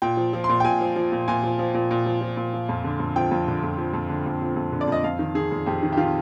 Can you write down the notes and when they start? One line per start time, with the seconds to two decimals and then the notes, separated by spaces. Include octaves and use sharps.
0.02 A#2 G5
0.17 F3
0.33 F3
0.44 C6
0.49 A#2
0.60 G5
0.64 A#2 G#5
0.81 F3
0.96 F3
1.12 A#2
1.28 A#2 G#5
1.44 F3
1.59 F3
1.74 A#2
1.91 A#2
2.06 F3
2.21 F3
2.37 A#2
2.53 F3
2.69 F2
2.84 D3
3.00 F2
3.16 F3 G5
3.31 F2
3.48 D3
3.63 F2
3.78 F3
3.93 F2
4.09 D3
4.26 F2
4.42 F3
4.56 F2
4.72 D3
4.81 D5
4.88 F2 D#5
5.04 F2 F5
5.19 D#3
5.35 D#3 G#4
5.51 F2
5.66 F2 G4
5.83 D#3
5.93 G4
5.97 D#3 F4